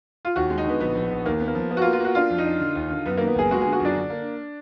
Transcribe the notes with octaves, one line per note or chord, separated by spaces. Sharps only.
F4
D#2 F#4
G#3
D#4
D3 B3
A#1 B3
A#1
A#1
D#2 A#3
B3
A#3
F3
A#3 B3
F#4
F4
A#3
F4
A#3 F#4
D4 F4
F2
D#4
D4
D3
D#2
D3
F#2 B3
A#3
D#3
B3
F#1 G#4
G#3 F#4
G#4
D3
F#4
F#2 D4
D3
A#3